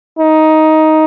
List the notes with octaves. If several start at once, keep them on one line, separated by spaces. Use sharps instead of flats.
D#4